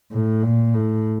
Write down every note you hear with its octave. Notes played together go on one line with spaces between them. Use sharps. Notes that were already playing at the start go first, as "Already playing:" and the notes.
A2
A#2
A2